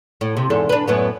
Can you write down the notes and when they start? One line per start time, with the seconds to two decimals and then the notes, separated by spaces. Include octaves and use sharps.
0.21 A2
0.37 C3
0.50 E2 G#2 A4
0.69 D4 B4
0.88 F#2 A2 B3